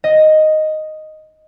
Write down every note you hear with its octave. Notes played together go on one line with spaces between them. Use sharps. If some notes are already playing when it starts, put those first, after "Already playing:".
D#5